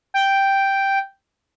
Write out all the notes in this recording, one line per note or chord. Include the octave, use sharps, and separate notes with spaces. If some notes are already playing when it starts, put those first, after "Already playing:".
G5